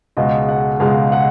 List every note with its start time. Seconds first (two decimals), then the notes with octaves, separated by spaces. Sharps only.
0.17 C#2 B2 G#3 D#5
0.49 F#5
0.80 C#2 B2 G#3 F5
1.12 F#5